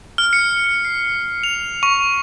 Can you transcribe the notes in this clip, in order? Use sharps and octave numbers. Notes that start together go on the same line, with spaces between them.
F6
C#7
C7
F7
C#6